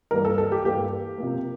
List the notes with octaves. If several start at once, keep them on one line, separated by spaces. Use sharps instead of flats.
G2 E3 G3 A#3 A#4
A4
A4
G4
G2 E3 G3 A#3 G4
C3 F3 A#3